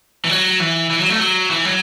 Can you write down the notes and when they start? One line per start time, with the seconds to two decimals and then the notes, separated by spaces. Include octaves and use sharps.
0.25 E3
0.29 F#3
0.60 E3
0.90 E3
1.01 F#3
1.10 A3
1.20 F#3
1.50 E3
1.65 F#3